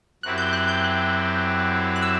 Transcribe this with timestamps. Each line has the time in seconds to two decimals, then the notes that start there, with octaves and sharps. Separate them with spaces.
0.23 F#2 F#3 C4 E4 G4 F#6
0.38 G6
0.53 F#6
0.68 G6
0.83 F#6
1.96 F#6
2.02 E6